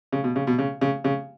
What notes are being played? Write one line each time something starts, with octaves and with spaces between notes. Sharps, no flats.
C#3
B2
C#3
B2
C#3
C#3
C#3